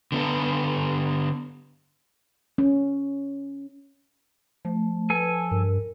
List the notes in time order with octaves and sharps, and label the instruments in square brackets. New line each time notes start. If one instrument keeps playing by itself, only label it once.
[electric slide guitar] D3 B3 A4
[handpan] C#4
[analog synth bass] F3 [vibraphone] A3
[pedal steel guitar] A4 G#5 [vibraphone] B4
[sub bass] G2 [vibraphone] A#4